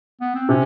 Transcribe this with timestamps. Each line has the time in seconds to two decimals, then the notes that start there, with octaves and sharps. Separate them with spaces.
0.21 B3
0.35 C4
0.49 C3 C#4